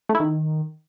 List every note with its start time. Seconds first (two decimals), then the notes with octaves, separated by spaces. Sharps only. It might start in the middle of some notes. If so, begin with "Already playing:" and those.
0.09 A3
0.15 E4
0.20 D#3